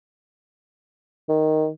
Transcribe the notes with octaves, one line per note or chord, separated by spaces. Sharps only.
D#3